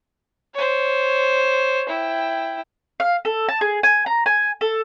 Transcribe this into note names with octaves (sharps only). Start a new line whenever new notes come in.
C5 C#5
E4 G5
F5
A4
A5
G#4
G#5
A#5
G#5
A4